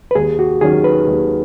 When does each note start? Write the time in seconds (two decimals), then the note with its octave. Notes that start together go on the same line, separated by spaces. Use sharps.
0.11 B4
0.15 D#2 G#4
0.39 F#4
0.61 D#3 F#3 C#4 G#4
0.84 B4
1.07 D#2